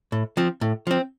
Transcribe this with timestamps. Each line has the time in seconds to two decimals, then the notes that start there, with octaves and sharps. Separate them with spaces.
0.12 A2
0.37 F3 C4
0.61 A2
0.87 F3 C4